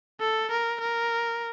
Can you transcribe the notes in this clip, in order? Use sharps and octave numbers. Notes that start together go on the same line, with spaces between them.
A4
A#4
A#4